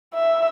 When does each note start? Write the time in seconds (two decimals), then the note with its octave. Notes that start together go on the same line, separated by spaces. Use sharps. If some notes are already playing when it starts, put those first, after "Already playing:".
0.14 E5